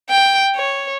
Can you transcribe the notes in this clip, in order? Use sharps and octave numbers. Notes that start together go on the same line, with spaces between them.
G5
C#5